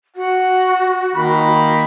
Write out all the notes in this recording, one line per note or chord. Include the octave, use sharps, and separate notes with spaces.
F#4 F#5
D#3 A#3 B5